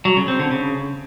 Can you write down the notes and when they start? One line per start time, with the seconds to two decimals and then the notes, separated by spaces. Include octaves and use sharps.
0.05 F#3
0.17 C#3
0.28 C4
0.39 D3
0.51 C#3